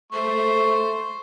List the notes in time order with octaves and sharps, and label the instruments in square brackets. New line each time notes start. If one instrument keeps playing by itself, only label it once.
[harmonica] A3 C#6 [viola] C5